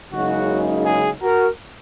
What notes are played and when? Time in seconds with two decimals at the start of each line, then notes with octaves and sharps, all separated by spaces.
0.12 F#1 F#2 C#3 G#3 D#4 F#4
0.86 G#4
1.22 F#4 A#4